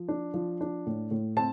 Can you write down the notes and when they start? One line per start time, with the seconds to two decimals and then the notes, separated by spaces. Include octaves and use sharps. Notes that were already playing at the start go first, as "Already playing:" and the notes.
Already playing: F3
0.08 D4
0.34 F3
0.61 D4
0.86 A2
1.11 A2
1.37 C4 A5